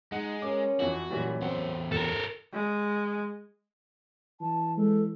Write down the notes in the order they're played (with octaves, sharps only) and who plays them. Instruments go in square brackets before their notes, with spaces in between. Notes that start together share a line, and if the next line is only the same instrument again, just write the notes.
[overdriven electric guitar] G#3 [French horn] D#4 [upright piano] F#5
[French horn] C#4 [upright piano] A#4 D6
[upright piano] F2 E3 [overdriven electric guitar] F#4
[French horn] F#2 [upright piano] A#2 E3 G3
[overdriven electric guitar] E2 C5 [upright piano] C4 F#5 G5
[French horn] D2 [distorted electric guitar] A4 A#4
[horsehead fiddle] G#3
[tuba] E3 [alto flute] A5
[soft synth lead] G#3 [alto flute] A4